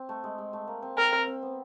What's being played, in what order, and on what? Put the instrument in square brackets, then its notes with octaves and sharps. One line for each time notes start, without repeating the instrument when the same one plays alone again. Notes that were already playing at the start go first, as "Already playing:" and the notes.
Already playing: [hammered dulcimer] C4
A3
G#3
G#3
A3
A#3
C4
[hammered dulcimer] C4 [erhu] A#4
[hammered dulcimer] C4
C4
B3